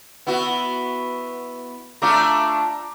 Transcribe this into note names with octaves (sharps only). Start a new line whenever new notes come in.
B3 E4 F#4
A3 D4 F4 A#5 D6